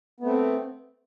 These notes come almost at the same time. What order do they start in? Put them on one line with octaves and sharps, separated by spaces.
B3 A3 C4